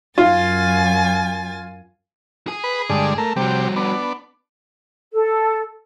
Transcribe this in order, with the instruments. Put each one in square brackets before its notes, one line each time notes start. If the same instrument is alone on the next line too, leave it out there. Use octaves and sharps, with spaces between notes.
[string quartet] F#2 G#5 A6 [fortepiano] F4
[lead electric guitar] G#4 G#5
[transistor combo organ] B4
G2 D3 G#3
A3 A#4
[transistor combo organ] C3 G4 [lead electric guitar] G3 F#4
[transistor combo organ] B3 D4
[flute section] A4